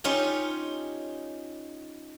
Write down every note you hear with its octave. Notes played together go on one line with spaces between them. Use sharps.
C#4 D#4 F4 G4